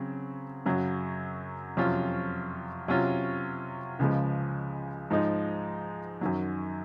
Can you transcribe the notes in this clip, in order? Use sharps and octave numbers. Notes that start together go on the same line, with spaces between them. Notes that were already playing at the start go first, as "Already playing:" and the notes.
Already playing: C#3 F#3 C4
F#2 C#3 F#3
F2 C3 F#3 C#4 F4
C3 F#3 C#4 F4
C#2 C#3 F3 G#3
G#2 F3 G#3 D#4
F#2 D#3 F#3